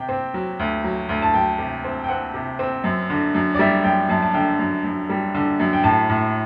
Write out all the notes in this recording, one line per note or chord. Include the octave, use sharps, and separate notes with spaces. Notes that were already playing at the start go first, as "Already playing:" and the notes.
Already playing: C3 G5
C4
F#3
D2
F#3
D2
A5
F#3 G5
C3
C4
G5
C4 F#5
C3
C4
F#2
D3
F#2
D5
G3 E5
F#2 G5
F#2 A5
A5
D3 G5
F#2
F#2
G3
D3
F#2
G5
A2 A5
A2